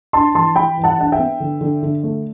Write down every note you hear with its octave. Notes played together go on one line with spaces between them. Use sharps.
D4 A5 C6
E3 A5 C6
E3 G5 B5
E3
F#5 A5
D4 F#5
E5 G5
B3
D3
D3
D3
A3